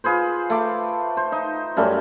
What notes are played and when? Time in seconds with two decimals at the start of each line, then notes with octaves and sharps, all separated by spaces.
0.04 F4 G#4 B4 C5
0.50 A3 D6
1.17 C5
1.32 D#4
1.77 F#2 G3 A3 C#4